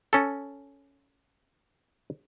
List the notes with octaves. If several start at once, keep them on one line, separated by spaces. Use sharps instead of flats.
C#4 A4